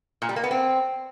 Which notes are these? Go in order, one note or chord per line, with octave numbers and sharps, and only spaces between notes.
A#2
G3
A#3
B3
C4